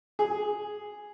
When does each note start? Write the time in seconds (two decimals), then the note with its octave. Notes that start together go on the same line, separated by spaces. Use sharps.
0.19 G#4